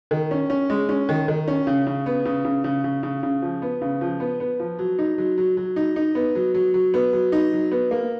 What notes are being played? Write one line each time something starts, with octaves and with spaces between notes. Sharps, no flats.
D#3
C#4
C#4
G#3
C#4
D#3
D#3
C#4
C#3
C#3
B3
C#3
C#3
C#3
C#3
C#3
C#3
F3
B3
C#3
F3
B3
B3
F3
F#3
D#4
F#3
F#3
F#3
D#4
D#4
B3
F#3
F#3
F#3
B3
F#3
D#4
F#3
B3
A#3